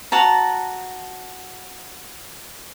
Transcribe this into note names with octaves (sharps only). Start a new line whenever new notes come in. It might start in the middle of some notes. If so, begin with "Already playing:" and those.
F#4 A5 A#5